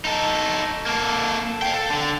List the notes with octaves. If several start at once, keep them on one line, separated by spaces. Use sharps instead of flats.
D#4 A4
A#3 A4
F5 G5
A4
D3